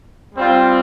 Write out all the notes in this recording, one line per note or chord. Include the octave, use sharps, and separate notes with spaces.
G3 C4 F4